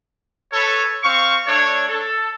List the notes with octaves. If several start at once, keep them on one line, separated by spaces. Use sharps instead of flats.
A4 B4 C#5
C4 F5 C#6
A3 D4 C#5
A4